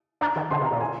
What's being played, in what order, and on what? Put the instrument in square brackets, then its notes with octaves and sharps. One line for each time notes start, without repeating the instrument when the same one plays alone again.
[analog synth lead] D4 [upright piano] A#5
[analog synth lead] D#3
[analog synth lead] D3 [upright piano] C6
[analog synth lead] C3
[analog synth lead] A#2 [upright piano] A#5
[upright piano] G#5